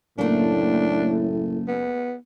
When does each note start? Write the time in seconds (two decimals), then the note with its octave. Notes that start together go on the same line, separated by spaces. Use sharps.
0.18 F#1 A2 A3 A#3 D4
1.68 B3